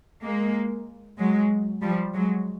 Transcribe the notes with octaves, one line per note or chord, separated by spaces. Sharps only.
G#3 A#3
F#3 G#3
F3 G3
F#3 G#3